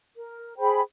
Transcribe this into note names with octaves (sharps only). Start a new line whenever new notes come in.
A#4
G#4 C5 G5 B5